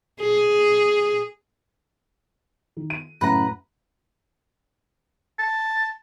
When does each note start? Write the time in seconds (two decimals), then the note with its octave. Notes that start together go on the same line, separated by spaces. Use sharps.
0.21 G#4
2.77 D#3
2.90 D#7
3.21 F#2 A2 C#3 B4 F#5 A#5
5.39 A5